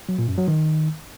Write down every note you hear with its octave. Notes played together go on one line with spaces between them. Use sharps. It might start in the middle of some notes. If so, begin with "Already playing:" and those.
F#3
A#2
F#2
F#3
D#3